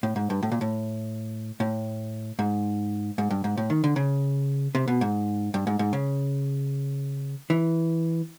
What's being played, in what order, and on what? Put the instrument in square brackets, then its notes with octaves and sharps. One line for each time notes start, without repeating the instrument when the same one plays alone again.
[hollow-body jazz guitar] A2
G#2
G2
A2
A#2
A2
A2
G#2
G#2
G2
G#2
A2
D#3
D3
C#3
C3
B2
G#2
G2
G#2
G#2
C#3
E3